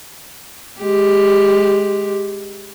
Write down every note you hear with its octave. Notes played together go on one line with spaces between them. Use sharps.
G#3 G4